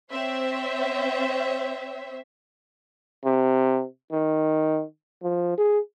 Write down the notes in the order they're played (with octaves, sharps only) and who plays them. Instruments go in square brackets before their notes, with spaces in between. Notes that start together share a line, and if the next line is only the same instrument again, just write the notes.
[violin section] C4 C5 C#5 E5
[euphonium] C3
D#3
F3
G#4